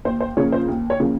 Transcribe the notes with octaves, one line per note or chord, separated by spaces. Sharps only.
D#2 C5
C5
C#3 F3 A#3 C#5
C5
D#2
C#5
C#3 F3 A#3